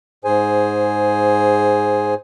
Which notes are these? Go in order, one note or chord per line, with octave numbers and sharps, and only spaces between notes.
G#2 G#4 C5 G#5